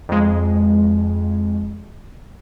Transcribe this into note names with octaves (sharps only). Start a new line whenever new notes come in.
F2 G#3